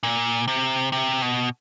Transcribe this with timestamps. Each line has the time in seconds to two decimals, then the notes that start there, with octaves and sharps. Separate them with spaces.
0.03 A#2
0.48 C3
0.92 C3
1.22 B2